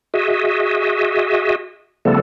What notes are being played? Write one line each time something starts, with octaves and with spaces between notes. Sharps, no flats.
F#4 G#4 D#5 E5
C#3 F3 G3 A3 B3 A4